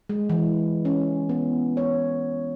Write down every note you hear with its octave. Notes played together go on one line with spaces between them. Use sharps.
G#3
E3
C#4
B3
C#5